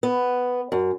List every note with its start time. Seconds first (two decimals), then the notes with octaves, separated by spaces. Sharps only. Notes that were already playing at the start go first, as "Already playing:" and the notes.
0.03 B3
0.72 F#2